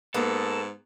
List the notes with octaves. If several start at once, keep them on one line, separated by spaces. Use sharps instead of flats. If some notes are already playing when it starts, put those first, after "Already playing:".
G#2 A#3 B3 A4